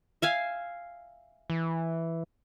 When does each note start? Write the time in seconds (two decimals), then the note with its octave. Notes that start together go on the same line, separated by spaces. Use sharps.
0.22 E5 F5 G#5
1.50 E3